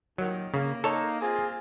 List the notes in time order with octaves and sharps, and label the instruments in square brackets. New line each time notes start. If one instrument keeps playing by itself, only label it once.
[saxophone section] D#2 A#2 D#3 [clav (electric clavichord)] F#3
[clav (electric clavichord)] C#3 [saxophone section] A#3
[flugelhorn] D#4 [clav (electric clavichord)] A4 C#5
[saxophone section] A#3 C4 F4 [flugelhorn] G#4